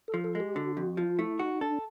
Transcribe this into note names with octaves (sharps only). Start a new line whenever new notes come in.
A4
F3
A4
G#3
G4
D3 F#4
F2 F#4
F3 F4
A3 E4
D#4 F#4
D4 A4